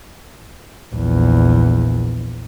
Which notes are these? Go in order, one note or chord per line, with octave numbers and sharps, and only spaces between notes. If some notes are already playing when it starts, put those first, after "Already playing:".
A#1 E2